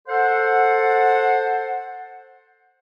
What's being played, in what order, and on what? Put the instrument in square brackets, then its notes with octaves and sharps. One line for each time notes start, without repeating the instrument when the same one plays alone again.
[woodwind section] A4 C5 F#5